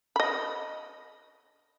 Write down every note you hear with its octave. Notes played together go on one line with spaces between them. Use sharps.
D#5 B5